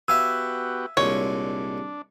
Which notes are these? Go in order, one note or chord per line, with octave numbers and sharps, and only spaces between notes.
B3 F#4 G4 E5 F5 G#5 E6
C2 A#2 G#3 D4 C#5